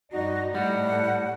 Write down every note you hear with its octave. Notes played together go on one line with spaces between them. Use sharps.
G2 D#4 F#4 D5
A2 G3 F#5